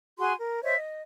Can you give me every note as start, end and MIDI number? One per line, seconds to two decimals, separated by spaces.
0.18 0.32 66
0.18 0.32 68
0.18 0.32 80
0.18 0.32 84
0.38 0.63 70
0.63 0.74 72
0.63 0.74 73
0.63 0.74 75
0.63 0.74 76
0.75 1.02 75